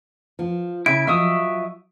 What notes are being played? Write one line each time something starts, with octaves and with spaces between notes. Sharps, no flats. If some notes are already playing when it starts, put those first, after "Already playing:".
F3
C#3 E4 D7
F3 F#3 D#5 E5 C#6 D#6